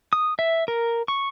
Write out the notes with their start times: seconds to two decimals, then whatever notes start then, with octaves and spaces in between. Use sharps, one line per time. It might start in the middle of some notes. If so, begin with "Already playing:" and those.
0.13 D#6
0.39 E5
0.68 A#4
1.08 C#6